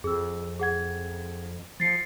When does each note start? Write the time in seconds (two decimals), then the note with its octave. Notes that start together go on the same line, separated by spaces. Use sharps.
0.04 F2 G#4 E6
0.60 G#4 F#5 G#6
1.80 F3 A6 C7 C#7